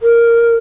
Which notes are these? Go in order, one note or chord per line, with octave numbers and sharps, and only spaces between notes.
A#4